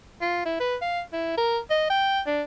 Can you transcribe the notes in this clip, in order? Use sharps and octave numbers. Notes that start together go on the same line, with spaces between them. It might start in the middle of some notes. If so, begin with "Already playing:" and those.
F4
E4
B4
F5
E4
A#4
D#5
G5
D4